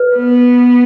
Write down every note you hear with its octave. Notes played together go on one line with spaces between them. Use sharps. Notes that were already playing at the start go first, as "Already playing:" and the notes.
Already playing: B4
B3